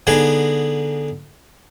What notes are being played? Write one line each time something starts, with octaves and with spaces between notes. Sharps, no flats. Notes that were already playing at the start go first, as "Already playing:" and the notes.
D3 B3 D#4 G#4